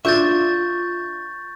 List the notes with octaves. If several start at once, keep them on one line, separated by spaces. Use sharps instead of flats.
D4 F4 E5 C#6 G6 A6